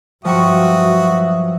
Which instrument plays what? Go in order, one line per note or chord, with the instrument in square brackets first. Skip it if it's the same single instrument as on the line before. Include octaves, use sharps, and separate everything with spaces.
[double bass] G2 F#3 [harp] F3 G5 C#6 [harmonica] F#4 D#6 [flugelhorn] E5